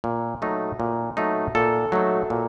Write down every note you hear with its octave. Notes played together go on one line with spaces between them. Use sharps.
A#2
F#3 A3 D#4
A#2
F#3 A3 D#4
A#2 A4
F#3 A3 D#4
A#2